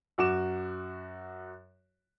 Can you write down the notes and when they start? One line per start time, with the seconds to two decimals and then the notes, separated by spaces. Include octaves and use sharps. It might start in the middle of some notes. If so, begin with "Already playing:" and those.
0.18 F#2 F#4 D6 E7